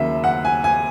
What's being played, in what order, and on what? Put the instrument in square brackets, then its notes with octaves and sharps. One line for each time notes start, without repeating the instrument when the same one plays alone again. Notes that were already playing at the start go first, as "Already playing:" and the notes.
Already playing: [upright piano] D#2 C#3 F#3 A#3 E5
F#5
G#5
G#5